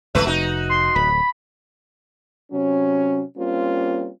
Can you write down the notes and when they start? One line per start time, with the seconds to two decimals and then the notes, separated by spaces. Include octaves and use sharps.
0.15 G#1 C#2 F3 A3 B4 E5
0.27 F1 D#4 F#4
0.69 C6
0.96 D1 B5
2.52 C3 F#3 C#4
3.37 G3 A#3 C4 C#4 F4